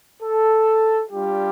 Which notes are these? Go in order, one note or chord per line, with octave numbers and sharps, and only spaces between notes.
A4
G3 D4 F4 G4